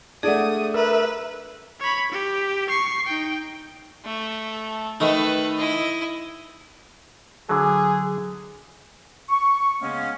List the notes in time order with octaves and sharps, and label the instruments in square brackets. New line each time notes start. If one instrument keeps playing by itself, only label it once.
[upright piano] A3 D4 [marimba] G#4 D5 F#5 [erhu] D#6
[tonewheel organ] A#4 E5 [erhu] B4
[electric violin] C#5 B5
G4
C#6 C7
D#4 G5
[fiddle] A3
[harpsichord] D#3 A3 D#4 [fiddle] A4 B4
[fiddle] E4 D#5
[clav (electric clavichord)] D3 F#3 [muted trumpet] G#4
[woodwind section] C#6
C#3 G#3 A#3 B3 C#4